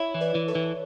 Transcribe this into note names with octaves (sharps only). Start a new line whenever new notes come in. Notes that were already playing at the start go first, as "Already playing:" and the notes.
Already playing: E4 C#5 E5
E3
B4 D5
E3
A4 C#5
E3